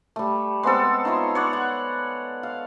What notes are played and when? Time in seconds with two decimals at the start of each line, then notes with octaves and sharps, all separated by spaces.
0.16 G3 A3
0.63 G#3 B3 C4 A4
1.05 D#4 F4 C#5 E5
1.35 C#5 D5 F#5
1.53 F#5
2.43 F5